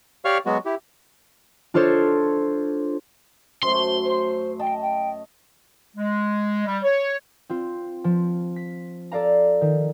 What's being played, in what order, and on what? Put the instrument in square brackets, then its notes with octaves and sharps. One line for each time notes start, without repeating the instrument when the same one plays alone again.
[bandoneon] G4 C#5 D5 F5 C#6 F6
F#3 G#3 B3 F#4
E4 G4
[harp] D4 F4 A4 C5 C#5
[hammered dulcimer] F#2 A3 [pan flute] C5 [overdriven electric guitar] C6
[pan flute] C5
[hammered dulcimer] D#5 A5 [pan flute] G5
[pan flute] G5
[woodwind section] G#3
G3
C#5
[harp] C4 F4
F3
B6
A4 D5 F5 A#5
D#3